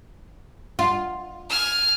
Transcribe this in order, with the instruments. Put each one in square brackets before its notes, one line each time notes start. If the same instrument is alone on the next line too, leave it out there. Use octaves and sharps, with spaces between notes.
[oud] F4
[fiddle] G#5 F6